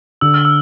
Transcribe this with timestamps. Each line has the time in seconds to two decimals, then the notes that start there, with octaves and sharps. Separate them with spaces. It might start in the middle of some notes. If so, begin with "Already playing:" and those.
0.21 D3 E6
0.34 F6
0.45 E6